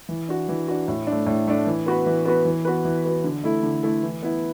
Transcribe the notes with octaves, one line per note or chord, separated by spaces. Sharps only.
E3
D4 F#4
E3
D4 F#4
A2
A3 D4
A2
A3 D4
E3
B3 F#4 B4
E3
B3 F#4 B4
E3
B3 F#4 B4
E3
B3 F#4 B4
D3
A3 E4 A4
D3
A3 E4 A4
E3
B3 E4